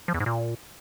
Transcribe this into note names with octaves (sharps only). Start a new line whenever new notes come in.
F3
E2
G#2
A#2